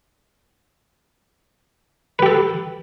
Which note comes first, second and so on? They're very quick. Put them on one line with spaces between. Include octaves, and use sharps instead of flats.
B4 G4 A4